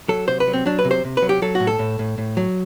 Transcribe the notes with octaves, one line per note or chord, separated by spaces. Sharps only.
F#3 A4
C3 C5
B4
F#3
C4
F#3 D4
B4
C3
C5
C3
B4
F#3
G4
F#3 A4
F#4
A2
A4
A2
A2
A2
F#3